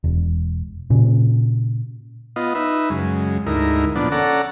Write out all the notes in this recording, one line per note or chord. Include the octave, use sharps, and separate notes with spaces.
E1
A#2 C#3
B3 F4 D#5
D#4 B4 E5
F#2 C#3 G#3
D2 G#2 D#4 E4 A#4
A#2 D3 F3 B3 D4
C#4 A4 D5 F#5 A#5